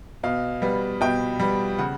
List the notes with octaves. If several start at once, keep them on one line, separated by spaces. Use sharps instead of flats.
B2 F5
G3 B3
B2 G5
G3 B3
C#3 F#5